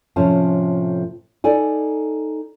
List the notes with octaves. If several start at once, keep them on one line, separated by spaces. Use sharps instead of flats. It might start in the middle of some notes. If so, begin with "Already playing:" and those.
A2 C3 F3 A3 C#4 A5
D#4 A4 D5 G#5